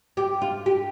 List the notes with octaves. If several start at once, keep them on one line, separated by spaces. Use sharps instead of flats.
G4
F4
G4